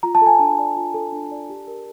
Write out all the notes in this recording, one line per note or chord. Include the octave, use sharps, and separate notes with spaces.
F4 A#5
A5
A4 G#5
D4 A5
D5
F4
A4
D4
D5
G4
A#4